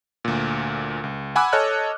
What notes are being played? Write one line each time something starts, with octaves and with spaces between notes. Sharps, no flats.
D2 A#2
C#2
F#5 G#5 B5 D6 E6 F#6
A4 C#5 D#5 A5 F6 F#6